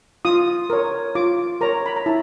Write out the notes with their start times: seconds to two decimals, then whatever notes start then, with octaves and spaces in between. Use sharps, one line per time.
0.25 F4 D#6
0.70 A#4 C#5
1.15 F4 D6
1.61 A#4 C#5 A#5
1.86 B5
1.96 A#5
2.06 E4 A5